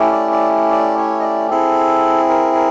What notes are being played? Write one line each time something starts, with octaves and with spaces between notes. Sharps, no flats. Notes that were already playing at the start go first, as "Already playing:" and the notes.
Already playing: A3 C#4 E4 G4
D5
D5
D5
C#5
D#5
D5
C4 E4 G#4 A4
A#4
A#4